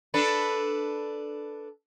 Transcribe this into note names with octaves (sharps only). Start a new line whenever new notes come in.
D4 A4 B4